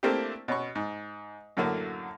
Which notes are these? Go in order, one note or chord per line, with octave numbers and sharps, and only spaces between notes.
A3 A#3 C4 D4 E4 G4
B2 C#4 B5 C#6
G#2
F#2 A2 D3 F#3 A3 A#3